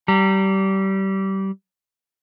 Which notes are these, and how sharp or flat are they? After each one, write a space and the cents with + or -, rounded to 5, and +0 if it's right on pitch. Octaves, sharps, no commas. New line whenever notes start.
G3 -25 A#5 -20